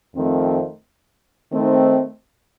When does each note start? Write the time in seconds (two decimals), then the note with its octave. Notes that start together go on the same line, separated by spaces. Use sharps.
0.14 F2 D#3 A3 C4
1.51 D#3 A3 C4 D#4